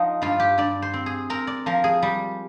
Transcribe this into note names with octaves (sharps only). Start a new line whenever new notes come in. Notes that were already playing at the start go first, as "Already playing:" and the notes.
Already playing: F3 D#4
G2 F4
G4
G2 D5
C5
C4
G#4
C4 A#4
D5
F3 A#4
G#4
G3